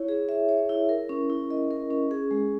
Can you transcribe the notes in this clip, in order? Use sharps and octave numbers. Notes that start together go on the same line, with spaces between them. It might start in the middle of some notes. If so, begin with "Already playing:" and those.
Already playing: E4 C#5
G#4
E5
C#5
E4
A#4
C#4
E4
D#5
A#4
C#4
G#4
G#3